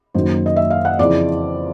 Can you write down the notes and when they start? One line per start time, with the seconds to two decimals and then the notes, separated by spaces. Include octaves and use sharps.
0.14 F#1 F#2 D#3 F#3 A#3 C5
0.46 D#5
0.56 E5
0.70 F5
0.85 F#5
0.99 F2 C#3 E3 D5